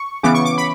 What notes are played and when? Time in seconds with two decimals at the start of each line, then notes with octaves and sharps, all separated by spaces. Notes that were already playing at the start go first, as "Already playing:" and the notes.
Already playing: C#6
0.23 C#3 E3 B3 D6
0.34 C#6
0.45 D6
0.58 B5